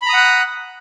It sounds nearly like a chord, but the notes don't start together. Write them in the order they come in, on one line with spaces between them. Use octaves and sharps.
B5 A#5 D#6 F#5 F#6